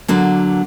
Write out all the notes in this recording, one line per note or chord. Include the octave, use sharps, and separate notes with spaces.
D3 F#3 A#3